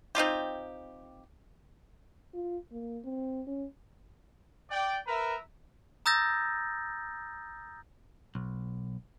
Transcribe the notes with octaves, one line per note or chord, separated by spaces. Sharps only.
C4 D#4 F4 G4
F4
A#3
C4
C#4
D5 G5
A#4 B4 E5 A#5
A#5 D#6 E6 G6 A6 A#6
B1